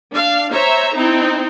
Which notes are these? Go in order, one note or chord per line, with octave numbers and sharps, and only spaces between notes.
D4 F5
C5 C#5 E5 A#5
C4 D#4 E4